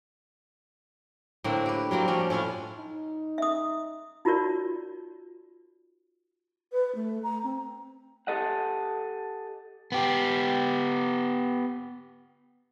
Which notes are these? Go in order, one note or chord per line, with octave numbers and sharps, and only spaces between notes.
A2 D3 A#3 C4
G4 B4
F#3 G3 A#3 C4
F3 C#4 D4
A2 C#4 E4 F4
D#4
E5 D#6
D#4 F4 F#4 A#4 C#5 D5
B4
A3
A#5
C4
G4 A4 D#5 F#5
B3 G4